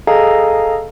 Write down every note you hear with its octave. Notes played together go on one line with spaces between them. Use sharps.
G#4 A4 D#5 F5 G#5 A#5